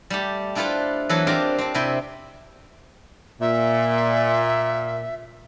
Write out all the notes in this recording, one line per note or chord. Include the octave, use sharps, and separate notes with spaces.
G3 A3 G4
D4 E4 F4 A4 B4 C5
E3 F#3 B3 A4
C4 D4 F4 G4 A#4 C5
C4 D4
C3 E4 E5 G5
A#2 E5